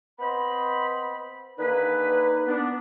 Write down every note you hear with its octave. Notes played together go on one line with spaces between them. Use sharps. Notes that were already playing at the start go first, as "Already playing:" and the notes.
B3 C4 C5 D#5 B5
D3 D#3 A#3 D#4 G#4 B4
B3 D4